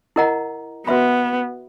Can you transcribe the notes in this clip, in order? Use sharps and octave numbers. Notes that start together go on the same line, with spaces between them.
E4 A#4 D#5 F#5 A#5
B3 F#4 B4 E5 B5